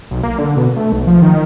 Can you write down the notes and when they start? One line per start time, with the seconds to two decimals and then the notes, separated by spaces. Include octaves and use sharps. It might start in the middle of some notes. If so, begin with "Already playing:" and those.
0.11 B1
0.23 A#3
0.38 D3
0.57 B2
0.76 A3
0.92 B1
1.07 F3
1.22 D#3